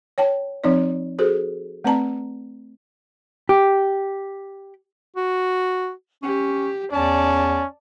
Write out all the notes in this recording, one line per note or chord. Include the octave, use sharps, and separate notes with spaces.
C#5 G5 A5
F3 C4 D#4 C#5 D5
F#4 G#4 A4 C5
A3 C4 B4 D5 A5 A#5
G4
F#4
C#4 G4
E2 C#4 D5 A5